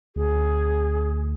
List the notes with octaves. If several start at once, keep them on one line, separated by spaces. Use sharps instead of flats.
D2 G#4